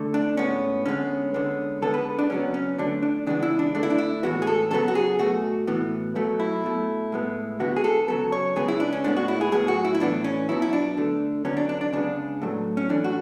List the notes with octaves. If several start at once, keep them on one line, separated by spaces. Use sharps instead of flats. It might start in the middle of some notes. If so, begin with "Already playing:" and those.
Already playing: D3 A3
D4
A2 G#3 B3 C#4
D3 G#3 B3 C#4
D3 G#3 B3
D3 G#3 B3 A4
B4
D4
C#3 F#3 B3 C#4
C#4
D3 A3 D4
D4
C#3 E3 G#3 B3 D4
E4
D4
D3 A3 D4
E4
D4
E4
A2 E3 G#3 B3 F#4
G#4
A4
C#3 F#3 B3 A4
F#4
G#4
B2 A3 F#4
A2 E3 B3
B2 F#3 A3
E4
B2 A3
A2 G#3 B3
D3 G#3 B3 F#4
G#4
A4
C#3 F#3 B3 A4
C#5
C#3 G#3 B3 G#4
E4
D4
C#4
A2 G#3 B3 D4
F#4
E4
G#4
A2 F#3 B3 G#4
F#4
E4
E4
A2 E3 B3 D4
C#4
B2 F#3 B3 E4
E4
D4
D3 A3
D3 F#3 B3 C#4
D4
D4
D4
C#3 G#3 B3 D4
A2 F#3 A3
C#4
A2 E3 A3 D4
F#4